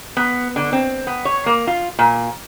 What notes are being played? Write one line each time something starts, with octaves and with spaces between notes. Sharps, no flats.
B3
D3
C4
B3
C#5
A#3
F4
A#2